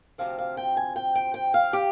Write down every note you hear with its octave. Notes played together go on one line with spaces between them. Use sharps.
D2 C3 F3 C4 F5
F5
G5
G#5
G5
G5
G5
F5
G4